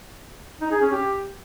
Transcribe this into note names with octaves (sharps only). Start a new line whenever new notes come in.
D#4
G#4
C#4
G4